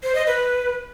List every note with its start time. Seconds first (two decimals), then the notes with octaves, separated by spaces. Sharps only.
0.03 C5
0.15 D#5
0.27 B4